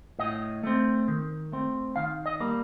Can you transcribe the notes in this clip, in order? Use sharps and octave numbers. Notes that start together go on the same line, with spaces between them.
A2 D#5
A3 C4
D#3
A3 C4
D#3 F5
D#5
G3 A#3